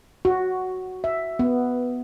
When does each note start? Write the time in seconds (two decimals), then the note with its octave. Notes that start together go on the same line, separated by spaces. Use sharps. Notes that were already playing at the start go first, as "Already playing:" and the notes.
0.25 F#4
1.04 E5
1.39 B3